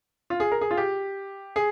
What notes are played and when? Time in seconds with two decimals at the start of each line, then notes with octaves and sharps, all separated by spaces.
0.30 F4
0.40 G#4
0.52 A#4
0.61 G#4
0.71 F4
0.77 G4
1.56 G#4